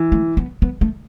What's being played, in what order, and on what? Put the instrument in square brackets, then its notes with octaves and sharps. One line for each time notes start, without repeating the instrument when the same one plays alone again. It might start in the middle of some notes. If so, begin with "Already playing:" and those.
Already playing: [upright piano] E3
[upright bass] A3
B3
B3
A3